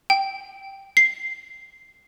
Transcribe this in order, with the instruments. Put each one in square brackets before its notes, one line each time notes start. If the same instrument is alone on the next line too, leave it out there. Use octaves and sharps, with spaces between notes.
[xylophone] G5
C7